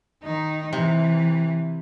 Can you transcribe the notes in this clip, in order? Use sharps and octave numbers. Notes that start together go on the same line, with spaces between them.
D#3 D#4
C3 E3